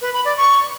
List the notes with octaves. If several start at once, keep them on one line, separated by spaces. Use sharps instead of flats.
B4
B5
D5
C#6